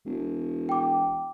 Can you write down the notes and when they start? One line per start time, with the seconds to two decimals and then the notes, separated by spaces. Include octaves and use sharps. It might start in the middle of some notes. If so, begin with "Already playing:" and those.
0.06 E1
0.69 G5 D6